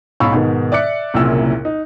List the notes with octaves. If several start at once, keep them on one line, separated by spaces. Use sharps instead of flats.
B1 G#2 F5 B5 C#6 E6
G#2 B2 D#3
D5 E5 D6 F#6 C#7
F#1 C2 F#2 A#2 E6
D#4